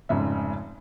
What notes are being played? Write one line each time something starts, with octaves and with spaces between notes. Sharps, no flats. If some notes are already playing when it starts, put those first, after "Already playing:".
F1 G#2 C#3 D#4 E5